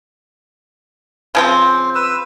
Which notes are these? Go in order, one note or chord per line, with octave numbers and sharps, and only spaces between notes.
C#3 F3 C4 C5
B4 E6